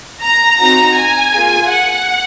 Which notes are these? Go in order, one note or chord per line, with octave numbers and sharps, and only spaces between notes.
A#5
C4 D#4 F#4 A#5
G#5
A#3 F4 G#4
F#5